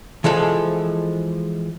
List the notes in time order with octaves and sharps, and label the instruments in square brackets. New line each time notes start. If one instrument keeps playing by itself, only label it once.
[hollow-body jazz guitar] E3 F3 G#3 A4